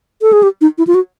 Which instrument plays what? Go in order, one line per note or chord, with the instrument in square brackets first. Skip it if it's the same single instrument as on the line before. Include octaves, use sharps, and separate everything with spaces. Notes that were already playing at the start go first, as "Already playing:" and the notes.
[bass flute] A4
G#4
G4
D#4
E4
F4
F#4